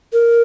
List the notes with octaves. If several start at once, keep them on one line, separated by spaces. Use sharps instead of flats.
A#4